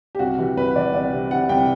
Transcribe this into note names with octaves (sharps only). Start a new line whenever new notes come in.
G4
C2 F#4
E3 G4
C2 B4
E3 D5
C2 D5
C3
C3 F#5
C2 G5